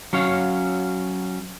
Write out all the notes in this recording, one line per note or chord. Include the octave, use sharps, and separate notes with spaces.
F#3 C#4 C#5 F5